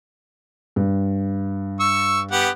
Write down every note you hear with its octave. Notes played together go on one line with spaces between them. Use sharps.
G2
C#6 E6
B3 G4 F#5